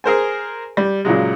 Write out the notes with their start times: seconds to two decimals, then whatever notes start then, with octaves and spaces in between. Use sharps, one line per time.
0.04 G#4 A#4 C5 G#5
0.77 G3
1.05 A#2 C#3 F#3 G#3